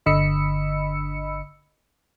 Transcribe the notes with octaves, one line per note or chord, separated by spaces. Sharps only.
G1 D3 D#5 B5 E6 C#7